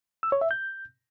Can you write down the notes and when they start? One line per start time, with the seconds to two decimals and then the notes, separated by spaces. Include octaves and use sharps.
0.23 E6
0.32 C#5
0.41 E5
0.51 G6